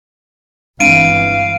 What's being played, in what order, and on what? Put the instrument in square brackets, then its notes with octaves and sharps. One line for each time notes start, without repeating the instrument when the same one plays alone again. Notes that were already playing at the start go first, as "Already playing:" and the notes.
[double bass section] G1 E3 [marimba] G#3 C4 D4 [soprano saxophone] F5 [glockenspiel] D7 D#7